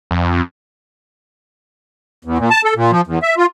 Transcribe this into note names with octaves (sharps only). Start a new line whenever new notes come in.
F2
E2
A#2
A5
A4
A#2
F3
E2
E5
F4